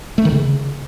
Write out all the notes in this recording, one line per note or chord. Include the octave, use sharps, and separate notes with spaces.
A3
D#3
C#3